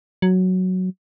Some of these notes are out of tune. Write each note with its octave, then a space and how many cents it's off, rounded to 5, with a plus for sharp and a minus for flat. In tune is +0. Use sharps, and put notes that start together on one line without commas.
F#3 +0